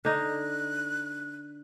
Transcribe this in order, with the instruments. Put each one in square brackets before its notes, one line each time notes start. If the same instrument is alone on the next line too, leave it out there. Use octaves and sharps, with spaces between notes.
[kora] D3 D#4 [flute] F#6